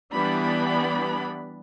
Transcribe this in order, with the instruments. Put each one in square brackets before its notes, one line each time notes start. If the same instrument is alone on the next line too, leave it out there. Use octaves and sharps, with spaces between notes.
[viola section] E3 G3 B3 D4 B5